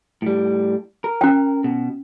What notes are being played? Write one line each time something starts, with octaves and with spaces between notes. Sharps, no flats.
A2 G3
A#4
C#4 G5
B2